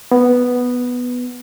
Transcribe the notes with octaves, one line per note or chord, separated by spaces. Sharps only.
B3